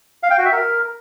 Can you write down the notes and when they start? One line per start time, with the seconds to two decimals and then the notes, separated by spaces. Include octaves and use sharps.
0.23 F5
0.30 G5
0.38 F#4
0.45 E5
0.52 A#4